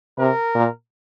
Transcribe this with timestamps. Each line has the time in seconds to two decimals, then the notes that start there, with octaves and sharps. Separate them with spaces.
0.19 C3 A#4
0.55 A#2